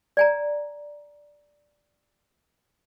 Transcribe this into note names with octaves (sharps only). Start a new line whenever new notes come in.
D5 G#5 A#5